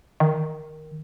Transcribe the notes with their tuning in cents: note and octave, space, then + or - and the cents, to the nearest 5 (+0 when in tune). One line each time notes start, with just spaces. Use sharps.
D#3 +0